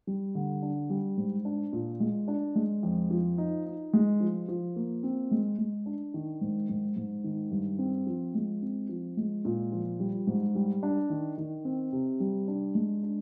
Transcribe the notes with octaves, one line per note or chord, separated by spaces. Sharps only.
G3
D3
D4
G3
G#2
D4
A#2
G#3
D4
G#3
F2
F3
D#4
D#4
G#3
F3
F3
A#3
C4
G#3
G#3
D4
D#3
G#2
G#2
G#2
D#3
G2
C4
F3
G#3
C4
F3
G#3
A#2
F3
G3
G#2
G3
D4
D#3
D#3
C4
C3
G3
D4
G#3
D4